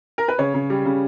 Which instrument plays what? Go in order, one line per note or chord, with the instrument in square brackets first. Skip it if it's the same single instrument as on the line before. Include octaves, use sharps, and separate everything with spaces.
[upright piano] A#4
B4
C#3 C#5
C#3
G3
C#3